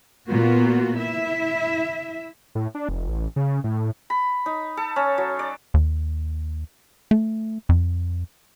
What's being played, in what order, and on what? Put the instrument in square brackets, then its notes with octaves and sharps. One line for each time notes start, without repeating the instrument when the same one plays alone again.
[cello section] A#2 B3 F4 F#4
E4 E5
[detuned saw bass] A2
D4
F1
A1
C#3
A2
[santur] B5
D#4
A4
C#4
F#3
D5
[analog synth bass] D#2
A3
F2